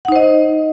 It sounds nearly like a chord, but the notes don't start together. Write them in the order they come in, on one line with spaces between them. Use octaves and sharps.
F#5 D#4 C5 D#5